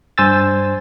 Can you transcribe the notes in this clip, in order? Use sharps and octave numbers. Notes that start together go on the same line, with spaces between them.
G2 C5 G#5 E6 A6